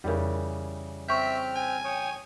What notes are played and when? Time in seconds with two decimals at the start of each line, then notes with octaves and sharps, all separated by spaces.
0.04 F2 C#3 E3 G3 A#4
1.08 C4 E5 G5 C#6 F6 G6
1.56 G#5
1.84 C#5 G5 D#6